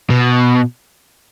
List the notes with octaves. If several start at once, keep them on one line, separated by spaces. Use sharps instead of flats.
B2